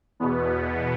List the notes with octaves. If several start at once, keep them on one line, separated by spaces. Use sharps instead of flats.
E2 B2 B3